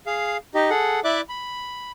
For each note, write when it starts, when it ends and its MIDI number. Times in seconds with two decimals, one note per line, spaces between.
0.07 0.37 68
0.07 0.37 77
0.55 0.70 63
0.55 0.70 67
0.55 0.70 75
0.70 1.00 68
0.70 1.00 69
0.70 1.00 78
1.04 1.21 64
1.04 1.21 74
1.04 1.21 76
1.04 1.21 86
1.04 1.21 90
1.29 1.92 83